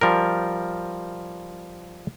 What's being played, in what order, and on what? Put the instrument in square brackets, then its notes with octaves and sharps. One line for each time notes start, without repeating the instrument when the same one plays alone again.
[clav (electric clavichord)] F3 G3 A#4